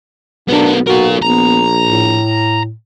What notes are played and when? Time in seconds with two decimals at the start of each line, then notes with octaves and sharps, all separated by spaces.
0.49 B1 B3 D4 A#4
0.87 B1 F4 F#4 A#4
1.22 A#1 B3 A#5
1.85 A2